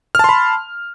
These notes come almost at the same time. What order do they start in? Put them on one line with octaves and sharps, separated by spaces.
F6 A5 C6 B5